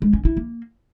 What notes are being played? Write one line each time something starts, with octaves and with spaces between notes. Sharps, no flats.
G#3
C#4
E4
A#3